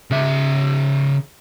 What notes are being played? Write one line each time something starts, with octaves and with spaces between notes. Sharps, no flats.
C#3 E5